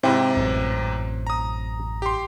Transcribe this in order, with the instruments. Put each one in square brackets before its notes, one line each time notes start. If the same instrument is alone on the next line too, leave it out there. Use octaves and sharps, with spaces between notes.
[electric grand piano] G#2 C3 [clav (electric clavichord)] C4 E4
[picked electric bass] A1 F#2
[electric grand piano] A#5 D#6
G4 C6